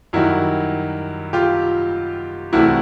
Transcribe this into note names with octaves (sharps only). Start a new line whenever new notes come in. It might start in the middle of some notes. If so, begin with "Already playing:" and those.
F#2 D#3 G3 E4 F#4
F4 G4
C2 C3 E3 A3 E4 F#4